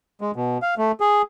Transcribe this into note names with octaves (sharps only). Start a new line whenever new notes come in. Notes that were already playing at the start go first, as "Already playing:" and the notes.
G#3
B2
F5
A3
G#4